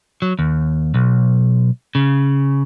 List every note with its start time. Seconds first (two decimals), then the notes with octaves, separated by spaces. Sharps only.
0.22 F#3
0.39 D#2
0.94 B1
1.95 C#3